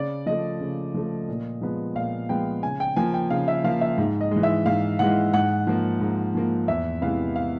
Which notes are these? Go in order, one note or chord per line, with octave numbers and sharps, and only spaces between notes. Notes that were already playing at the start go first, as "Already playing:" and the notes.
Already playing: C#3 D5
F3 A3 D#5
C#3
F3 A3
A#2
F3 G#3 B3
A#2 F5
F3 G#3 B3 G5
C#3 G#5
G5
F3 A#3 G#5
G5
C#3 F5
E5
F3 A#3 F5
E5
G#2
D#5
E3 G#3
E5
G#2 F5
E3 G#3 F#5
G#2 F#5
F3 A#3
G#2
F3 A#3
E2 E5
C3 E3 G#3 B3 F5
F5